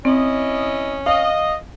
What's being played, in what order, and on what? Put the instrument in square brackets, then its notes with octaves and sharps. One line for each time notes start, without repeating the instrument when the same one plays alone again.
[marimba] C4 [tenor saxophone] C#4 [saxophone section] E4 D#5
[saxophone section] D#5 [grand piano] F5